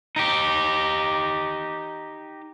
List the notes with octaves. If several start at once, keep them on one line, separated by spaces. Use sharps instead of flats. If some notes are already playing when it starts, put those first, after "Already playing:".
D#4 G4